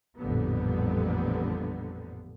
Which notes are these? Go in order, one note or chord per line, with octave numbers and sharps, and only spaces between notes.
A1 F2 A#2 D3 G3 B3